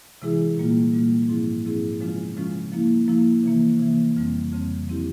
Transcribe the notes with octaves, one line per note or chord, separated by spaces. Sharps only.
C3 E3 G#3 E4 G#4
A#2 G3 A#3 F4
A#2 G3 A#3 F4
G#2 F3 C4 E4 G#4
G#2 F3 C4 E4 G#4
C#3 F3 G#3 C#4 F4
C#3 F3 G#3 C#4 F4
F3 A#3 E4
F3 A#3 E4
C3 E3 A#3
C3 E3 A#3
F2 C#3 G3 C4
F2 C#3 G3 C4
F3 C4 E4 G4